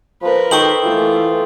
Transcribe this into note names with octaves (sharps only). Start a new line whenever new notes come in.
F3 A#4 B4
D#3 A4 C5 G5 C#6 D#6 F#7
E3 A3 F4